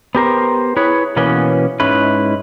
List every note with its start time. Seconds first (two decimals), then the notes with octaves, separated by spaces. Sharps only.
0.15 B3 G4 A#4 C5
0.76 E4 G#4 B4 C#5
1.16 B2 E3 A#3 B3 C#4
1.80 G#2 G#3 C#4 E4 B4